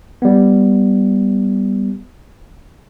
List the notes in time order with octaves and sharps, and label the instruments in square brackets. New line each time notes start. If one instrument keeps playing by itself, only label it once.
[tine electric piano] G3 B3